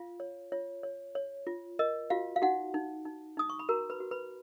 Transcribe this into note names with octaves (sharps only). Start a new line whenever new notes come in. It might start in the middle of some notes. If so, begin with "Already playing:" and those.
Already playing: F4 F5
C#5
F4 C#5
C#5
C#5
F4
A#4 D#5
F4 F#4 F5
F5
D#4 F#4 F#5
D#4
D#4
D#4 D#6
C#6
B5
F#4 A#4 A#5
B4 B5
F#4
B4 B5